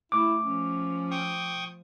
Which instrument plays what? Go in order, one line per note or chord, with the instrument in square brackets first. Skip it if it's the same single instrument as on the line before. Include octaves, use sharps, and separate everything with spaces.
[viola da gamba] A3 [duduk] E4 [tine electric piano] D6
[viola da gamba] F3 [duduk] C#4
[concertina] G5 C#6 D#6